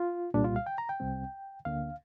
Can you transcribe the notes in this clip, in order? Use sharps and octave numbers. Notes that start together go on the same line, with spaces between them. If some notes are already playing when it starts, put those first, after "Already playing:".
Already playing: F4
C2 A#2 G3 D4
F4
F5
G5
A#5
G5
C2 C3 G3 C4
D2 D3 A#3 D4 F5